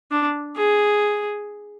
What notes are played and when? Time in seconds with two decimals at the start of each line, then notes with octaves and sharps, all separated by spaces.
0.11 D4
0.57 G#4